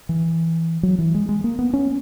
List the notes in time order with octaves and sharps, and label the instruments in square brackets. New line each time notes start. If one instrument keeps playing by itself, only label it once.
[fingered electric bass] E3
F#3
E3
G#3
G#3
A#3
B3
C#4